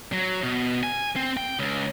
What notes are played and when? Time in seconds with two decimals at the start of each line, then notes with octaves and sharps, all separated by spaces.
0.13 F#3
0.43 B2
0.83 G#5
1.16 C4
1.37 G5
1.59 C#2